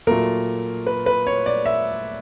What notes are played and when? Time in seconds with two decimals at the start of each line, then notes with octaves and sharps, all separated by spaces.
0.07 A#2 F#3 A3 A#4
0.87 B4
1.06 B4
1.27 C#5
1.46 D5
1.66 E5